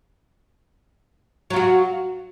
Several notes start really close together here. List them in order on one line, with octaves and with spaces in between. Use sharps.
F#3 F4 F#4